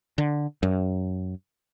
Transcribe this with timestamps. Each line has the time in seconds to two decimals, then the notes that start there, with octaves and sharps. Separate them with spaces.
0.18 D3
0.63 F#2